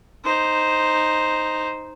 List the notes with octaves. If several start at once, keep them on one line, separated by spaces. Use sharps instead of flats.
D#4 C5